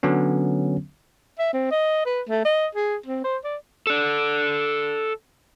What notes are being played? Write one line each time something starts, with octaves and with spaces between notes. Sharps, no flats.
D3 F#3 B3 C#4
E5
C4
D#5
B4
A3
D#5
G#4
C4
C5
D5
A4 D5